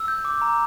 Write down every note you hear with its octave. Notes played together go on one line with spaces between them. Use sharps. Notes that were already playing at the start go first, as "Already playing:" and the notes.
Already playing: E6
G6
D6
A#5